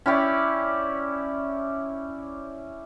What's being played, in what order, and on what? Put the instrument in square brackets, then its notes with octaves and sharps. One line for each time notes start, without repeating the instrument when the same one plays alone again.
[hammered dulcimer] C#4 E4 G4 D5